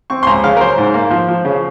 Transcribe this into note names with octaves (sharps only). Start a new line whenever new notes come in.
C4 C#6
C6
C#2 A#5
C#3 F5
A#4
F#3 C5
G#2
A#3
F3
F3
C#3